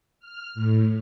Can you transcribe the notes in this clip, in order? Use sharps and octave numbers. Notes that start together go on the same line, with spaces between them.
F6
A2